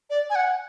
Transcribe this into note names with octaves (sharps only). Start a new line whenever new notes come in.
D5
G#5
F#5